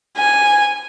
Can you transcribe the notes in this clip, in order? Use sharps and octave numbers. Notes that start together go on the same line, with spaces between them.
G#5